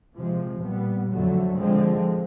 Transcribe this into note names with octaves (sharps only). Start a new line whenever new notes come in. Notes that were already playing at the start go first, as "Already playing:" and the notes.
C3 F3 G#3
A#2 G3 B3
F2 D3 F#3 A3
D3 F3 G#3 C4